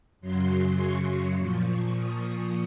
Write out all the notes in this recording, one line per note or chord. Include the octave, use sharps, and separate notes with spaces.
F#2 C#3 F#3 C6
C#6
C#6
A#2 F3 C#6
D#6